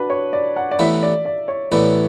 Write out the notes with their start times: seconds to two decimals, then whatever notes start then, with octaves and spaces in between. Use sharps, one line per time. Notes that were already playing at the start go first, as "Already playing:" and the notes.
Already playing: D4 F#4 B4
0.10 C#5
0.33 D5
0.56 F#5
0.71 D5
0.79 A1 A2 E3 B3 E5
1.03 D5
1.25 D5
1.48 C#5
1.72 A1 A2 E3 B3 D5